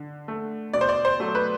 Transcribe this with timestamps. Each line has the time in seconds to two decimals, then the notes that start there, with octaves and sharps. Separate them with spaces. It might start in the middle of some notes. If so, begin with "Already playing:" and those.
Already playing: D3
0.28 A3
0.73 B2 D5
0.81 C5
0.89 D5
1.05 C5
1.20 F#3 A3
1.35 B4